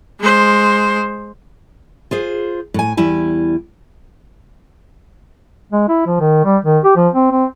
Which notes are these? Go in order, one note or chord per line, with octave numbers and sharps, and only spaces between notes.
G#3 C5
F4 G#4 C5
A2 G#5
E2 G3 E4 G#5
G#3
E4
F3
D#3
G3
D#3
G4
F3
C4
C4